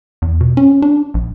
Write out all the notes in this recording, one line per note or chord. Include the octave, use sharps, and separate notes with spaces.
E2
B2
C#4
D4
A#1